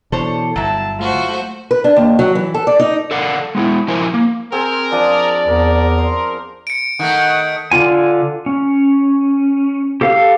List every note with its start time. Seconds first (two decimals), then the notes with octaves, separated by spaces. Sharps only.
0.12 B2 E3 D4 A4 C5 C#5
0.56 G1 F#3 E4 A5
0.99 A3 F4 F#4 C5
1.71 B4
1.84 D4
1.97 D#2
2.19 F#3
2.35 E3
2.54 A4
2.67 D5
2.80 D#4
3.11 A4 A#4 D5 F5 F#5
3.55 G#3 B3 C4 E4
3.88 F3 E4 A#4 C5 G#5
4.14 A#3
4.52 C4 G#4 A#4
4.92 F3 D4 D5 D#6
5.48 E2 A#4
5.98 C5
6.67 C#7 D7
6.99 D#3 A3 F#5
7.71 D3 D4 F4 G#5
8.46 C#4
10.01 G4 A4 F5